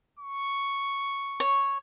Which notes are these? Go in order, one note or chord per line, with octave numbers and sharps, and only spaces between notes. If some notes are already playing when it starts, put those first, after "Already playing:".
C#6
C#5